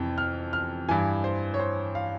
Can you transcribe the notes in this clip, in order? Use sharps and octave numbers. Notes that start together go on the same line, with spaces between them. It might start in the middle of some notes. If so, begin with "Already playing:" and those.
Already playing: F2 C3 E3
F6
F6
G2 E3 G#5
C5
C#5
C5
F5